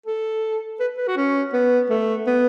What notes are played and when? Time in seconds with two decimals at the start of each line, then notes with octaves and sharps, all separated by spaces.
0.06 A4
0.80 B4
0.98 B4
1.07 F#4
1.17 C#4
1.53 B3
1.90 A3
2.27 B3